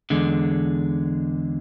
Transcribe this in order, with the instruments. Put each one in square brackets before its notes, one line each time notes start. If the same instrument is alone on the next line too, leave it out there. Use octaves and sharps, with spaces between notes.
[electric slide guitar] E2 D3 G#3